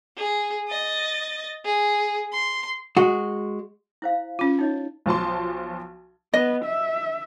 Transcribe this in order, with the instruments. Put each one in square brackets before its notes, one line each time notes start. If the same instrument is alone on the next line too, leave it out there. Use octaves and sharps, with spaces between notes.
[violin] G#4
D#5 A6
G#4
C6
[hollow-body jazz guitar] G#3 F#4
[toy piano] E4 C5 F5
[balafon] C#4 F4
[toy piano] D#4 C#5 D#5
[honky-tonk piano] B1 F3 A5 C6
[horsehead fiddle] B3 [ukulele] D#5
[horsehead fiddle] E5